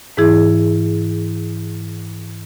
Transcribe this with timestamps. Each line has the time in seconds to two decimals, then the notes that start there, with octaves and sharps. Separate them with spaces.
0.17 G#2 E3 E4 G#4